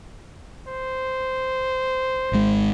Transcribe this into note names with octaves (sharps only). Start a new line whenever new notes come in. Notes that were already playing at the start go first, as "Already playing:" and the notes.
C5
G#1 G#3